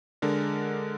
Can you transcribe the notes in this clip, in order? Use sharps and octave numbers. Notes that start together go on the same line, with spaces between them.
D3 G#3 D4 A#4